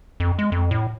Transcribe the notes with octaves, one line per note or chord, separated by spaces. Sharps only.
F2
G#3
F2
A2